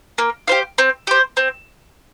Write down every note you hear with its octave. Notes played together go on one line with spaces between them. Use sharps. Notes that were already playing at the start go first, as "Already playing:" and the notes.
A#3
G4 C5 F5
C4
G4 C5
C4